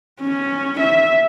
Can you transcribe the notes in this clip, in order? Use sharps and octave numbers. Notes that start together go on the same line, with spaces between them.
C#4
E5